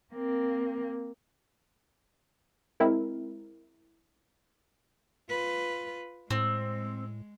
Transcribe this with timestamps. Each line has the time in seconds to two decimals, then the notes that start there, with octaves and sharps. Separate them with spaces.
0.14 A#3 C4
2.80 G#3 C4 E4 A#4
5.30 F4 B4
6.30 A2 G#3 C4